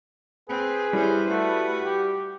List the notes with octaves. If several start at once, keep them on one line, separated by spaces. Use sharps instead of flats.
C4 G#4 B4
G3 C#4 E4 C5
A3 F#4
G4